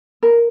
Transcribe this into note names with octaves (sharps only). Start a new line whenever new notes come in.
A#4